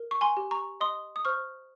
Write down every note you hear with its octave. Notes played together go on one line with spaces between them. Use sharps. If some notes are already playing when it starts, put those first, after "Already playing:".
Already playing: A#4
C#6
G#5 C6
G4
A#5 C#6
D#5 C6 D#6
D#6
C5 C#6 F6